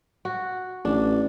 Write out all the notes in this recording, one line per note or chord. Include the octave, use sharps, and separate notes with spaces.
F#4
A1 D4